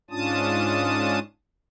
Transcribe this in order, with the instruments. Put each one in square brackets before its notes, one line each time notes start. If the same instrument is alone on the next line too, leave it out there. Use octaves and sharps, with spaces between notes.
[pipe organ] G#2 C#4 D4 F4 A5 D#6